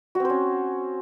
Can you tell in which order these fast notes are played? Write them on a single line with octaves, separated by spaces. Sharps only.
F#4 C4 C5 C#4